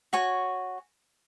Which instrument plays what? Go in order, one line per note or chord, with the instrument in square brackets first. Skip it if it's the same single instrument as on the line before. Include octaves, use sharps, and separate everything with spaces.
[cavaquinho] F#4 C#5 G#5 C#6